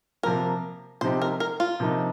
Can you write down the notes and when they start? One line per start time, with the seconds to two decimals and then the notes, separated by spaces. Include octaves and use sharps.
0.23 C3 F3 A#3 A#4
1.01 C3 F3 C4 D#4 G4 C5
1.22 A#4
1.40 A#4
1.60 F4
1.80 C3 F3 A#3 D#4